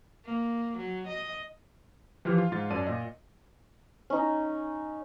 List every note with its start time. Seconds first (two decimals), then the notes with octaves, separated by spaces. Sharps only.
0.24 A#3
0.77 F#3
1.07 D#5
2.25 E3 F3 F4 G4 F6
2.38 F4
2.52 G#2 F4 A6
2.70 F#2 D5 A5 D#7
2.87 A#2 D#5
4.10 C#4 D#4